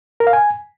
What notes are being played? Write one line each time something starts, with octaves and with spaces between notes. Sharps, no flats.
A#4
F5
G#5